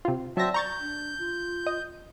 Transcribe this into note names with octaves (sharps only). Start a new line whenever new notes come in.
C3 F4
F#3 C4 D5 E5 A5 A#6
A#5 C#6 G6 A6
D4
F4
D#5